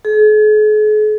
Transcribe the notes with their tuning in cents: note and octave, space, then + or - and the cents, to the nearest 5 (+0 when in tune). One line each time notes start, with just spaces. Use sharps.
G#4 +45